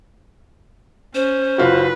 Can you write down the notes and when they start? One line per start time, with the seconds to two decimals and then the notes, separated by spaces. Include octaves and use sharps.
1.15 C#4 C5
1.58 F#1 F4 F#4 B4